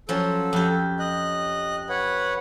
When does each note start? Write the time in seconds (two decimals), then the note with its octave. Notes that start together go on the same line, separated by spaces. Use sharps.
0.09 F3 F#3 C#4 A4
0.53 F2 G4
0.99 D#5 F#6
1.89 B4 C#5 F#5